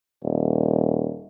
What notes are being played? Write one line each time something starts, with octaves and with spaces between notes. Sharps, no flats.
D#1